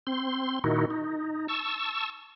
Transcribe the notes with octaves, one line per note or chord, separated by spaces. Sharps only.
C4 C6
A#2 D#3 D#4 E4 F#4
D#4
A5 C#6 E6